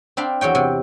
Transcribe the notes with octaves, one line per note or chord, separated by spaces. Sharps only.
C4 D4 F5 B5
E2 F#3 C#5 G5
C3